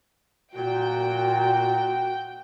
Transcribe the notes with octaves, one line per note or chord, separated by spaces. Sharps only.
A#2 F#4 G5